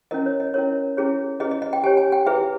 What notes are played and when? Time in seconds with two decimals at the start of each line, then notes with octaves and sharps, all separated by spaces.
0.11 C#4 E4 A#4 D#5
0.26 C#5
0.40 D#5
0.54 C#4 E4 A#4 C#5
0.97 C#4 E4 G#4 C#5
1.40 C#4 E4 G#4 B4 D#5
1.51 D#5
1.62 D#5
1.73 G5
1.83 G4 C#5 G#5
1.97 G#5
2.12 G5
2.26 E4 G#4 B4 E5